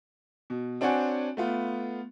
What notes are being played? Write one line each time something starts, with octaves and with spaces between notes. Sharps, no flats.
B2
C4 D4 F#4 C#5 F#5 G#5
A3 B3 F4